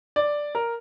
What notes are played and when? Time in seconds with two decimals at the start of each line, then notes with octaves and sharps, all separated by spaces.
0.16 D5
0.55 A#4